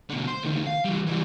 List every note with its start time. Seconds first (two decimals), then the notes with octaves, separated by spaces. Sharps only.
0.10 B2 D3
0.27 C5
0.43 D2 D#3
0.67 F5
0.85 E3 G3
1.06 E3 G3